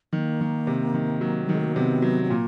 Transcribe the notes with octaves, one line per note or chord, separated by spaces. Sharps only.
D#3 A#3
D#3
C3
D#3
F#3
G3
D#3 G#3
A3
A#3
C3 B3
F#3
B3
A#2 A#3